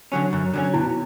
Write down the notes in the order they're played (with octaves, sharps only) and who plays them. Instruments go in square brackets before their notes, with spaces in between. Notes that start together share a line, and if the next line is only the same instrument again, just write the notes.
[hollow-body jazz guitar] D3 F#3 C#4
F#2
D3 F#3 C#4
[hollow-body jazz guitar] B2 [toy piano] E4